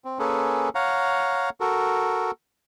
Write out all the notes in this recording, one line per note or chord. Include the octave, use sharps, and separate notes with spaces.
C4
A#3 C#4 G#4 A4 B4
C#5 F5 F#5 A#5
F#4 A4 A#4